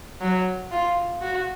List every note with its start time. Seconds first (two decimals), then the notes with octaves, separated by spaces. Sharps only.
0.21 F#3
0.72 F4
1.21 F#4